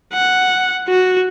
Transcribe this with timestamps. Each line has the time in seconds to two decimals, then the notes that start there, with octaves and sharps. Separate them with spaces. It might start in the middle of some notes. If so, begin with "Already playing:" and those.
0.13 F#5
0.88 F#4